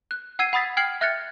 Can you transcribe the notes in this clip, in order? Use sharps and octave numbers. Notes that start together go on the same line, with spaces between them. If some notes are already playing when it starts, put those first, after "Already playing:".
F#6
F#5 E6 G#6 C7 D#7
F#5 B5 D#6 A6 B6
G5 F6 G#6 C7 F#7
E5 F6 F#6 G#6 A6 C#7